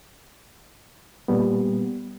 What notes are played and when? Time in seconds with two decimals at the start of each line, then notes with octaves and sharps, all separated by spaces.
1.28 A#2 G3 B3